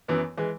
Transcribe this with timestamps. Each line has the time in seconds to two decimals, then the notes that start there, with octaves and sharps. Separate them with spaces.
0.08 F#2 E3 B3
0.38 E3 G#3